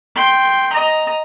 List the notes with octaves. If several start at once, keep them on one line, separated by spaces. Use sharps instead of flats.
G5 C6
D#5 A#5